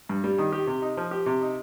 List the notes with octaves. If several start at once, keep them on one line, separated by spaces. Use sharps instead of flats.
G2
G3
D#3
G4
C3
D#4
F3
G4
C3
D#4